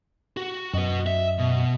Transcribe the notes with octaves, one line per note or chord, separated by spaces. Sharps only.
F#4
F#2 F#4 B4 D#5
E5
B2